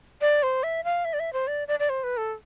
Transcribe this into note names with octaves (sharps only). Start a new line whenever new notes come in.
D5
C5
E5
F5
E5
D5
E5
C5
D5
D5
D5
C5
B4
A4